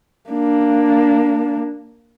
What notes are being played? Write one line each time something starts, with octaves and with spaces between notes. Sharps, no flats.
A#3 D4